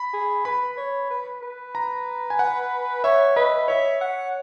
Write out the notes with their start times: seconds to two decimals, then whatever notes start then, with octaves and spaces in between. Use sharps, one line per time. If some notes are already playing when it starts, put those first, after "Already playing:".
Already playing: B5
0.13 G#4
0.45 B4 B5
0.77 C#5
1.10 B4
1.42 B4
1.75 A#5
2.30 G#5
2.39 F#5
3.04 C#5 E5
3.36 B4 D#5
3.68 C#5 E5
4.01 F#5